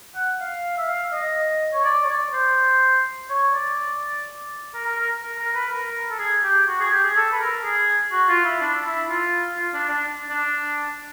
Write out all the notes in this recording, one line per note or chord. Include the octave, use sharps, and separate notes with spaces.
F#5
F5
E5
F5
D#5
C#5
D5
C#5
D5
C5
C#5
D5
A#4
A#4
A#4
A#4
A#4
B4
A#4
A4
G#4
G4
F#4
G#4
G4
G#4
A4
B4
A#4
G#4
F#4
F4
E4
D4
E4
F4
F4
D4
D4
D4